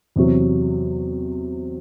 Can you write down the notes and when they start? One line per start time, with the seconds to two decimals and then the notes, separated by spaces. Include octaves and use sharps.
0.16 E2 C3 F#3